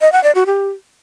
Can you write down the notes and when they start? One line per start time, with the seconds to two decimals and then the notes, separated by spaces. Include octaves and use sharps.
0.01 D#5
0.12 F#5
0.24 D5
0.35 F#4
0.46 G4